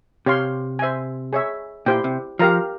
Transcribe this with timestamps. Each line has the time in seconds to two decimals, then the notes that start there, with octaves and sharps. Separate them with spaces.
0.26 C3 G4 C#5 F5 C6
0.79 C5 E5 G#5
1.33 G#4 C#5 E5
1.86 A#2 E4 G4 C5 G5
2.04 C3
2.39 F3 G4 A#4 F5 A#5